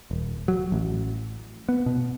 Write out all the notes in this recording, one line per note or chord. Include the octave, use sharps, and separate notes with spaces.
D#1
F#3
A1
B3
B2